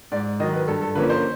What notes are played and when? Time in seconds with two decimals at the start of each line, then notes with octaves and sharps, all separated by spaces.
0.12 G#2 D5
0.40 D#3 F#3 D#5
0.54 B4
0.68 G2 A4
0.81 A4
0.95 D3 F3 A#3 C#4 B4
1.10 C5